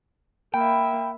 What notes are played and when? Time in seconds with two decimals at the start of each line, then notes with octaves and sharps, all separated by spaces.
0.54 A#3 E5 G5 B5